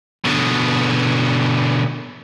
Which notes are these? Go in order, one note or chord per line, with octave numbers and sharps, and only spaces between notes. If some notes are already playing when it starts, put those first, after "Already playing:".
B2 D3